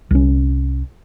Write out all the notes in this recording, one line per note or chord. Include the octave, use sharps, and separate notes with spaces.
C2 C#4